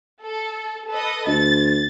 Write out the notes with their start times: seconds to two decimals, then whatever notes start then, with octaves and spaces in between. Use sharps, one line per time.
0.24 A4
0.89 A4 B4 D#5
1.27 D2 A6